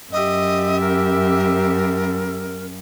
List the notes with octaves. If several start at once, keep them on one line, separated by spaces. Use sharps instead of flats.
F#2 G4 D#5 E5
A#4